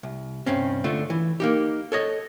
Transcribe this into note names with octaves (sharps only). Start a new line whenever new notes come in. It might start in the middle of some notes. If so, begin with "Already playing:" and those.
C2
C2 G2 C4 C#4
D3 A3 F4
E3
A#3 D#4 G4
A4 C#5 D#5